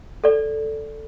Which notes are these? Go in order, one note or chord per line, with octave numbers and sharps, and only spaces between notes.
A4 D5